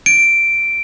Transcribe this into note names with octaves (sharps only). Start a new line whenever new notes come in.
D7